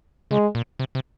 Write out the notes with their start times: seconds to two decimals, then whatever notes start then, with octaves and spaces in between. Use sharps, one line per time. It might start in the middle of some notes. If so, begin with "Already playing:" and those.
0.31 C#3 G#3
0.55 A#2
0.79 C3
0.95 C3